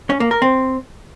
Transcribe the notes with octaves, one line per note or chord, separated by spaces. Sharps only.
C#4
A#3
A#4
C4